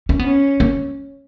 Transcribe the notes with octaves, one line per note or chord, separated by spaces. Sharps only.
C#4
B3 C#4
A#3